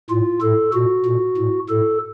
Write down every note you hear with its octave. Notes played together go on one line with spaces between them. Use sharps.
A2 F4
A2 A4
A#2 F#4
A#2
A2
A2 A4